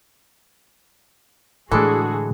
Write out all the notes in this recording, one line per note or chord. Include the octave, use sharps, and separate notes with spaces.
A2 D3 E3 G#3 D4 F#4 G#4 A4